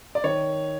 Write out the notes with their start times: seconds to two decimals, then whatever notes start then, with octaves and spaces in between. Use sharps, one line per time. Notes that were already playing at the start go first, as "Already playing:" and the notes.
0.15 D5
0.24 D#3 C#5